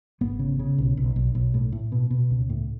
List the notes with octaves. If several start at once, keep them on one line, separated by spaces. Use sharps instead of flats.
G#1 B3
C#3
C#3
B1
B1
B1
B1
A2
A2
B2
B2
C#2
A2